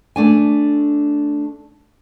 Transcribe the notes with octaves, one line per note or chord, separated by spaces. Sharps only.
A3 D4 G#5